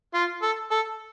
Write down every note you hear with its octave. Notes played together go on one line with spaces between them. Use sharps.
F4
A4
A4